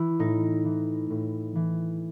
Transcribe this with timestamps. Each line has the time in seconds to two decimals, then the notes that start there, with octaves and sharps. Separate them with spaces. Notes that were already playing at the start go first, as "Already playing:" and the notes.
Already playing: E3 E4
0.19 A2 D#4
0.65 E3
1.10 A2
1.55 E3